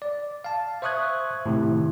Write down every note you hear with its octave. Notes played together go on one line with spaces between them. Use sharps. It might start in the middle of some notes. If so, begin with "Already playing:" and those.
D5
F5 A5
C5 E5 C#6 D#6 F#6 G#6
A2 C3 D#3 E4